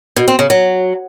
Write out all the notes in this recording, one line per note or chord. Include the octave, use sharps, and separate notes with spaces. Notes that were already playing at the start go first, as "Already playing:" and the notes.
B2
C4
C#3
F#3